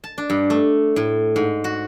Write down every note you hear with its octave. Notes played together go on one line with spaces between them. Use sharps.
A5
D4
G2
A3
A2
G#2
F#4